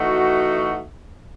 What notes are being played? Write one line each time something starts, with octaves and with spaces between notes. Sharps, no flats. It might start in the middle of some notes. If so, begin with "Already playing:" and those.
Already playing: E3 A3 D#4 F#4